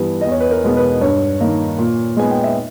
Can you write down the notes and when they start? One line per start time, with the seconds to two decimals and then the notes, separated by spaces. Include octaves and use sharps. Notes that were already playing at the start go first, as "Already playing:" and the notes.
Already playing: G2 E3 G3 B3
0.21 E2 D#5
0.31 C#5
0.40 B4
0.51 A#4
0.64 B2 G#3 B3
0.77 B4
1.01 G2 C#5
1.41 D#3 A#3
1.78 A#2
2.17 G#3 B3 G#5
2.31 G5
2.44 E5